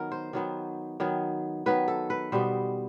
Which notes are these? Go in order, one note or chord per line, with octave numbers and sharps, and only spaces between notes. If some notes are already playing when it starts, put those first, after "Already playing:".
Already playing: D#3 F#3 B3 A#4
C5
D#3 F#3 B3
D#3 F#3 B3
D#3 F#3 B3 B4
A4
B4
B2 G3 B3 C5